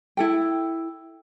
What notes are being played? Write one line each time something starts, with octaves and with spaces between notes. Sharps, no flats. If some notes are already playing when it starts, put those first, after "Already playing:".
E4 A4 G5